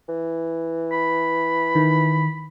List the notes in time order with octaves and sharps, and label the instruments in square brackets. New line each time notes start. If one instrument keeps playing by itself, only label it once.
[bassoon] E3
[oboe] B5
[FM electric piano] D#3